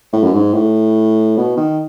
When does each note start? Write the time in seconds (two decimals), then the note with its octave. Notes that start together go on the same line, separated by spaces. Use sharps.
0.13 A2
0.23 F#2
0.33 G#2
0.54 A2
1.38 B2
1.57 D#3